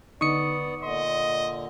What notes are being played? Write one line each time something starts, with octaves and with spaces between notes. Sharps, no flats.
D3 B3 D#4 D5 C#6 D#6 C#7
A#2 D3 D#5 C6